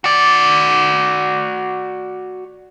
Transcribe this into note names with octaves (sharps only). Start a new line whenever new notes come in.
F#4 D5